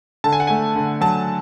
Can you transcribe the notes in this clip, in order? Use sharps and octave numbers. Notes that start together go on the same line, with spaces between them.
D3 A5
G#5
F#5
A3 G#5
D3
F#3 A5